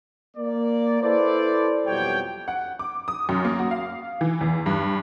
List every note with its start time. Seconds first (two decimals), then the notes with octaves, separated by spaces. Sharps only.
0.37 A#3 D5
1.01 E4 A4 B4 C5 D5
1.87 F2 B2 F#3 G3 C#5 G5
2.48 F#5
2.79 D6
3.08 D#6
3.29 F#2
3.45 A#3
3.59 F#4
3.71 F5
4.21 E3
4.41 E2
4.66 G2